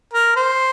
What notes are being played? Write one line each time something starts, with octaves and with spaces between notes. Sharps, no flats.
A#4
C5